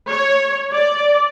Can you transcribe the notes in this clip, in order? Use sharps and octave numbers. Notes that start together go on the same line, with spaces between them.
C#5
D5